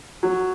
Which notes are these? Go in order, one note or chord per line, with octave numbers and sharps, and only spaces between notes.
F#3